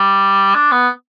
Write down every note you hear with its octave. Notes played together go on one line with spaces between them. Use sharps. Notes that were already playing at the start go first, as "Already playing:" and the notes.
Already playing: G3
D4
B3